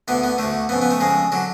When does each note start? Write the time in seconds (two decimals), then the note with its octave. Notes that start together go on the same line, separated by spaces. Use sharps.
0.08 D2 D3 B3
0.24 B3
0.38 D2 D3 A3
0.69 F2 C#3 B3
0.82 B3
0.91 A3
1.00 F2 C#3 G#3
1.32 D3 F#3